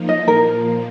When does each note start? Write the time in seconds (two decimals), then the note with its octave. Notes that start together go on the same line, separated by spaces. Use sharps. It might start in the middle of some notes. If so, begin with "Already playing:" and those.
Already playing: F3 A#3 D#4
0.09 D#5
0.28 A#2 F3 A#3 A#4